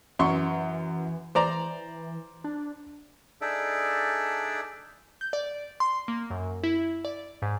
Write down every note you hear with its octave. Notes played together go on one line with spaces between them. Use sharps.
F#2 E3 C6 C#6
E3 C5 D5 A#5
D4
D4 D#4 G#4 A4 D5 E5
G6
D5
C6
A#3
F#2
E4
D5
G#2